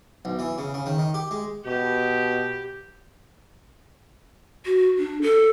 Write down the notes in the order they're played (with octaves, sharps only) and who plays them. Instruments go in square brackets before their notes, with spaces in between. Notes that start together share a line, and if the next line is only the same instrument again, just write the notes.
[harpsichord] B1
E3
C#3
C#3
D#3
D#3
G4
G#3
[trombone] B2 [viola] G4
[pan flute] F#4
D4
A4